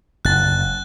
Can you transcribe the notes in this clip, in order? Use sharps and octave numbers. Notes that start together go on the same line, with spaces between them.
F#1 F#6 A6